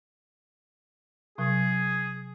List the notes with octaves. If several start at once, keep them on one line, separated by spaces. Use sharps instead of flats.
C3 F#3 G#4